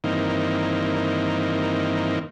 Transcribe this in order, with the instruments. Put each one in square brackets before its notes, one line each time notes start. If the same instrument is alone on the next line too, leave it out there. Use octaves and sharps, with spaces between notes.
[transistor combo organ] G2 D#3 E3 A#3 C4 D#4